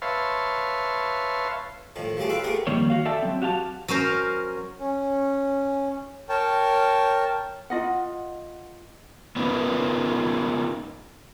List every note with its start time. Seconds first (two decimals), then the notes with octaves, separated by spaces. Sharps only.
0.02 B4 C#5 E5 F5 A5 C6
1.96 A2 D#3 F3
2.17 F3 F#3 A3 G4 G#4
2.29 F4 B4 E5 F5 G5 B5
2.44 A3 B3 G4 G#4 A#4
2.67 F2 D#3 G3 A#3 C#5
2.90 F#4 F5
3.05 A4 D5 E5 G5 A5
3.22 F#3 C4
3.42 F#4 G4 F5 G5 A5
3.88 F#3 C#4 A#4 C5
4.80 C#4
6.29 A#4 C#5 G5 A5
7.70 F4 D#5 F#5
9.36 B3 C#4 D#4 F4 A#4 B4